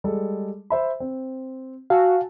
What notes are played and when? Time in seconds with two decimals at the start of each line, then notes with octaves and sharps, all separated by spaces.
0.04 G3 G#3 A4
0.70 C5 E5 B5
1.00 C4
1.90 F#4 F5 G#5 A5 E6